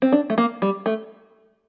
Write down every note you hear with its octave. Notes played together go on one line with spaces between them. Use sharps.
C4
D4
A3
A#3
G3
A3